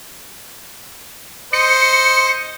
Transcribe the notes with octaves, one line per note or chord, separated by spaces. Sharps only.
C5 D#5 C#7